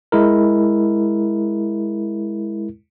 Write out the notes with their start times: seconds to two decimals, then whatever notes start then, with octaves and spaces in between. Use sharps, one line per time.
0.12 G#3 E4 A#4